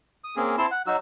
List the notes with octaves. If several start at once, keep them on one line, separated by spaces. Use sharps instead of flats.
D#6
A#3 C4 C#4 G#4
C4 E4 A5 C6
F#5
F#3 D#4 F#4 E6